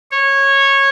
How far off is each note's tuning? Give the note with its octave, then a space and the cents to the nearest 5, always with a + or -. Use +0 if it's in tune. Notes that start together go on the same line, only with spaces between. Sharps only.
C#5 -15